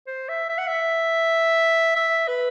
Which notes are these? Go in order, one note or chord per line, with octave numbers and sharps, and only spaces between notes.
C5
E5
E5
F#5
E5
E5
B4